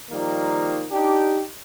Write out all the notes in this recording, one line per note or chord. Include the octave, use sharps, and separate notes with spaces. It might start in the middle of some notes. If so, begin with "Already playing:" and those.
D#3 F3 G3 A#3 D#4
D4 D#4 G4